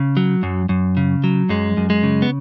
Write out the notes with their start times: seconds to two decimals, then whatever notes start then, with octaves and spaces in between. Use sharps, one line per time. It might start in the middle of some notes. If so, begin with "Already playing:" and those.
Already playing: C#3
0.17 F#3
0.43 F#2
0.69 F#2
0.97 C#3
1.24 F#3
1.49 F#2 G#3
1.77 F#2
1.90 G#3
2.03 C#3
2.22 B3